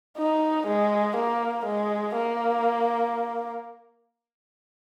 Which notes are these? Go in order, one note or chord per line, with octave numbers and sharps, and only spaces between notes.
D#4
G#3
A#3
G#3
A#3